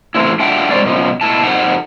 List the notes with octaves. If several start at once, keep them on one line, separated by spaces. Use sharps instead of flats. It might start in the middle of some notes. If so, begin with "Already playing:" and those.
E3 A3 C4 E4
D4 F4 E5 F#5 G5
F3 G3 G#3 C4 C#5 D5
F#2 B2 F3
B2 E4 A5
F2 D#4 F#5